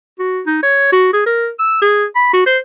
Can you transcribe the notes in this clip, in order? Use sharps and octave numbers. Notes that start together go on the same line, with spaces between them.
F#4
D#4
C#5
F#4
G#4
A#4
E6
G#4
B5
F#4
C5